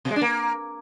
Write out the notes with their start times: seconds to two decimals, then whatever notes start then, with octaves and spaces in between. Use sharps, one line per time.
0.05 B2
0.11 G#3
0.16 D4
0.21 A#3